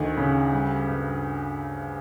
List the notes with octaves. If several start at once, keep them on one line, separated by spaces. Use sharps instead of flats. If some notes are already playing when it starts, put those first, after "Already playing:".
Already playing: D2 D#3
C#3
G3
G2